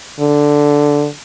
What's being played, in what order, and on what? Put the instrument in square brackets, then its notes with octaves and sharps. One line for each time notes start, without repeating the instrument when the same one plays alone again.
[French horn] D3